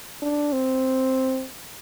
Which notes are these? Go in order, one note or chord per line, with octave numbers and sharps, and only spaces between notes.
D4
C4